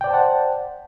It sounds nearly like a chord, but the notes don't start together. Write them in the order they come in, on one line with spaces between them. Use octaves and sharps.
G5 D5 C5 A5 F#5